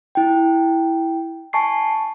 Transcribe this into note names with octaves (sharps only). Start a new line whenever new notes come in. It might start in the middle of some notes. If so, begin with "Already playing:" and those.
E4 G5
G#5 A5 C#6 C7